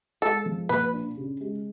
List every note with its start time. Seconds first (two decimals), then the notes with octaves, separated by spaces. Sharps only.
0.22 G#3 A4
0.46 F3
0.69 A#2 B4
0.93 D4
1.17 C#3
1.41 G#3